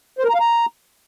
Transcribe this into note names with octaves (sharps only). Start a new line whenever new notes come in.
C5
A#4
A#5
F5
A#5